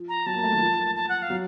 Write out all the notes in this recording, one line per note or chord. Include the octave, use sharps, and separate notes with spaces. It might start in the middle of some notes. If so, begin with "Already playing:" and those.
Already playing: F3
A#5
F#3 A5
A#3
A3
D#3
F3
A5
F#5
F5
F#3